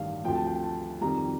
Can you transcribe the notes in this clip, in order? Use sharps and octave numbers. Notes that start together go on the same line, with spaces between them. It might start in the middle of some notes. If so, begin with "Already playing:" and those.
Already playing: A1 G2 D#3 G3 F5
D2 C3 F3 G5
A5
G5
A5
F2 C3 D#3 G3 A#5